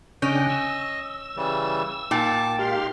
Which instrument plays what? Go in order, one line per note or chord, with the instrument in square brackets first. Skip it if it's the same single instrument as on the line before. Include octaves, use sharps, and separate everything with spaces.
[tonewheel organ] C#3 D4 G5 [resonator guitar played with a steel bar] C#4 [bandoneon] D#5
[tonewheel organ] E6
[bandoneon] C#3 E3 G3
[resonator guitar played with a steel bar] A#2 [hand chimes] D#4 G5 A6 [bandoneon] A5 D6
[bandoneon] G#3 A#4 [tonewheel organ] G4 F5 C6